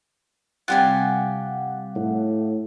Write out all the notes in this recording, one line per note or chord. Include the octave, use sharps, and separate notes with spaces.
C3 G3 F4 G4 F#5 G#5
A2